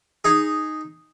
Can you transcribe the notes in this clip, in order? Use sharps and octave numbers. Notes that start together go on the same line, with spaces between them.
D#4 G#4